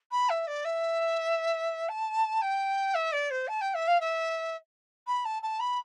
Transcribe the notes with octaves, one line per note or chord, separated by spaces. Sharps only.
B5
E5
D5
E5
A5
G5
E5
D5
C5
A5
G5
E5
F5
E5
B5
A5
A5
B5